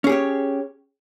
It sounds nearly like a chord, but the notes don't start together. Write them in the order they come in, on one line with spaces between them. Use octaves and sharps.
C#4 G#4 G4 C#5